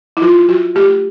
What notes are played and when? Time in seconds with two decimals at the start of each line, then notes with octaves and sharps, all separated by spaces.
0.17 E4
0.22 F#3 F4
0.49 F#3 F#4
0.75 A3 G4